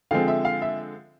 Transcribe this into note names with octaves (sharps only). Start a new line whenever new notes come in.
D3 F3 G#3 C4 F5
E5
F5
E5